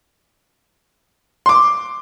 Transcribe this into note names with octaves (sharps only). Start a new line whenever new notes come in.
C6 D6